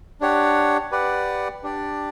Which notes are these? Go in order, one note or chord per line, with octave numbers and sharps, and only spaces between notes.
D4 G4 C#5 F#5
G4 B4 D5 F#5
D4 G4 D5